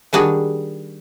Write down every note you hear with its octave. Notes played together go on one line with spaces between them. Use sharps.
D#3 G3 D4 F#4 G#4